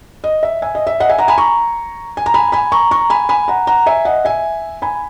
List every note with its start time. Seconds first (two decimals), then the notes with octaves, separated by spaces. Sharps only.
0.24 D#5
0.43 E5
0.62 E5 G#5
0.75 D#5
0.87 E5
1.00 D#5 F#5
1.09 E5 G#5
1.18 F#5 A#5
1.28 G#5 B5
1.38 A#5 C#6
2.17 G#5
2.26 A#5
2.34 G#5 B5
2.52 G#5 B5
2.72 A#5 C#6
2.91 A#5 C#6
3.10 G#5 B5
3.29 G#5 B5
3.48 F#5 A#5
3.67 F#5 A#5
3.86 E5 G#5
4.05 D#5 F#5
4.25 E5 G#5
4.82 G#5 B5